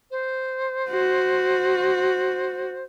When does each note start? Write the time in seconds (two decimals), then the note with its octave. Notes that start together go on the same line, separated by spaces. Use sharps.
0.11 C5
0.90 F#4